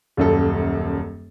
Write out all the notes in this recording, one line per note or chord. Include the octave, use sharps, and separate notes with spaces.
D#1 F#2 A4